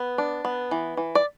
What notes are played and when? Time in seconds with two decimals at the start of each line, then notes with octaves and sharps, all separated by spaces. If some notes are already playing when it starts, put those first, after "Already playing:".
Already playing: B3
0.18 D4
0.45 B3
0.71 E3
0.97 E3
1.15 D5